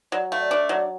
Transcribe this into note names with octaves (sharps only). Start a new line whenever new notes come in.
F#3 D5
A3 F5
D5
D4
F#3